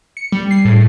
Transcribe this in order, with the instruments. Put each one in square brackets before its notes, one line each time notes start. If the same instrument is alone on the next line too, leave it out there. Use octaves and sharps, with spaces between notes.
[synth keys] C#7
G3
C7
A2